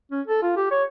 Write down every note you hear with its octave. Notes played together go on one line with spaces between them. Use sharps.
C#4
A4
F4
G4
C#5